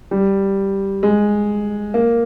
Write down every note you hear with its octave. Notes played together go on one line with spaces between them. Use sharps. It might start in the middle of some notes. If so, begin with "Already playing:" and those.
G3
G#3
A#3